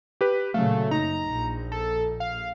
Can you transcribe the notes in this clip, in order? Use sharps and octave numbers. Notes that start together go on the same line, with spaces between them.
G4 B4
A#2 C#3 F#3 A3 F5
F#1 D#4 A#5
A#1
A4
F5